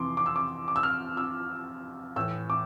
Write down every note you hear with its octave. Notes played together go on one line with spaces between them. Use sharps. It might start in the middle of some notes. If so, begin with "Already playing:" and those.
Already playing: F2 C3 E3 C6 D6
D6
E6
D6
D6
E6
F6
E6
A2 E3 E6
D6